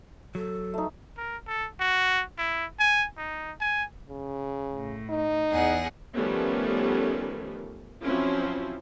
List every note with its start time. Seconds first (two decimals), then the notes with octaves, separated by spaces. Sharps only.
0.35 F#3 A4
0.74 A3 D#4
1.17 A#4
1.47 A4
1.80 F#4
2.38 E4
2.80 G#5
3.17 D#4
3.61 G#5
4.09 C#3
4.74 A2
5.10 D#4
5.51 E2 G#4 F#5
6.16 D#3 F3 G3 A3 B3 C#4
8.01 F3 F#3 C4 C#4 E4 F4